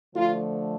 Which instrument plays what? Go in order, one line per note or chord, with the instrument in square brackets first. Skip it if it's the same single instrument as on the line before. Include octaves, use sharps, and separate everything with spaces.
[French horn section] D3 F3 A3 F4